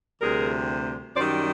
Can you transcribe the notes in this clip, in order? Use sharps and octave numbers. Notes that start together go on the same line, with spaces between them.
D2 C3 E3 G3 G#4 A#4
F#2 D#3 G3 C5 D5